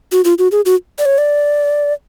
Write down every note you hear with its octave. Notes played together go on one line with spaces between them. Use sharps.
F#4
F4
F#4
G#4
F#4
D5
C#5
D5